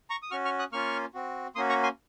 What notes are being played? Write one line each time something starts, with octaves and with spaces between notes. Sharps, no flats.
A#5 C#6
D#6
C#4 F#4 C#6 F6
C#6 F6
D#6 F#6
A#3 C#4 F4 C#6 F6
C4 F#4
A#3 C#4 F#4 C6 D#6
A#5 C#6
G#5 C6